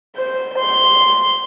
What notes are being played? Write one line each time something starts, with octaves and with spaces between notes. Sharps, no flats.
C5
C6